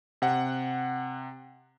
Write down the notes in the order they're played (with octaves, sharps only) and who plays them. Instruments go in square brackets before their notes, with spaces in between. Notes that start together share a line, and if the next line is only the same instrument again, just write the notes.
[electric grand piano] C3 F#5